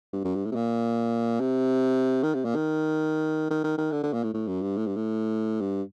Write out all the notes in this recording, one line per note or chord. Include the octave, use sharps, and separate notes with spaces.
G2
F#2
G2
A2
C3
A#2
C3
D#3
C3
A#2
D#3
D#3
D#3
D#3
D3
D3
A#2
A2
A2
F#2
G2
A2
G2
A2
G2